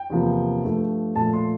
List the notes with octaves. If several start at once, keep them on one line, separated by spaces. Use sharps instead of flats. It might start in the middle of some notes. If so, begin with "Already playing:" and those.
Already playing: G5
E2 C3 F3 A#3
G2 F3 A3
A#2 F3 A3 A5
C6